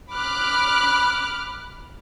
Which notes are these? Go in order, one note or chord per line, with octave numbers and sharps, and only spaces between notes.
B5 D6 F6 F#6